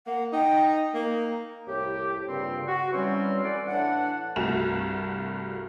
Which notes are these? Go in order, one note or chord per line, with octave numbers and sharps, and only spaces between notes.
A#3 F#5
D#4 G5
A#3 D#4
C2 A2 E4 G4
G2 A#2 C#3 C4 G5
F#4
E3 F#3 G3 C4 C#4
A4 B4 D5 F#5 G#5
A2 E3 D4 F#5
C2 G2 A3 F#4 E7 F7